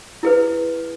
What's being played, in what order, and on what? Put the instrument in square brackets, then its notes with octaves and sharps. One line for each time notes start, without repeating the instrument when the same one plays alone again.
[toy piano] E4 G#4 B4